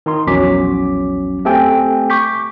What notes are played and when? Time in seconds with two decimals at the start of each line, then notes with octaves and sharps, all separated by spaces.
0.06 D#3 D#4 C6
0.27 A#1 E2 F#3 C#4 D6 B6
1.45 A3 C4 G4 A4 G5 G#5
2.10 C#6 D6 G6 B6